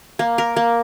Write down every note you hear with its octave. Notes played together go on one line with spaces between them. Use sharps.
A#3
A#4
A#3